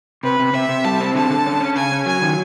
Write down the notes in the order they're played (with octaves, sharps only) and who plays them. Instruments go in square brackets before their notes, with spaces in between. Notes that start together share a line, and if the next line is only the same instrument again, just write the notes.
[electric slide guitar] C3 [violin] B4
[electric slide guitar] C3
[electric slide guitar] C3 [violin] E5
[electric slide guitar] C3
[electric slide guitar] G3 [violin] A5
[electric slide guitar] C4
[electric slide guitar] D3 [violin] A5
[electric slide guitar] D3
C#4
C#4
[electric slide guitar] C#3 [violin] G#5
[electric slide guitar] C#4
[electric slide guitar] F#3 [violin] G#5
[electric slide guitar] D#3